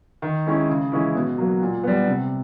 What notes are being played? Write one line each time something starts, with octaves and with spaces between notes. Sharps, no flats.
D#3
G#3 C#4 E4
C#3
E3 G#3 C#4 E4
B2
F#3 A#3
A#2
G3 B3
C3